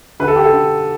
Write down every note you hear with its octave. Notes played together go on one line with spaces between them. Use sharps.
D3 B4
A4
G4
A4
D3